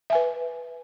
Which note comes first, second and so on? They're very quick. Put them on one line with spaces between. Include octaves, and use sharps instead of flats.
E5 G#5 B4